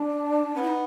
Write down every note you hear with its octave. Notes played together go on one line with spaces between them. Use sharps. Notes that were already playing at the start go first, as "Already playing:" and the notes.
Already playing: D4
B3 C#4
E4
D#4